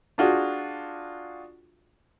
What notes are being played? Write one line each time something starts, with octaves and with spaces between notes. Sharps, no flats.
D4 F4 F#4 G#4